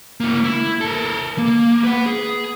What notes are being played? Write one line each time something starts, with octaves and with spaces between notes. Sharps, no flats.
A#3 E4
E4
A4 A#4
A#3
B4 F#5
G#4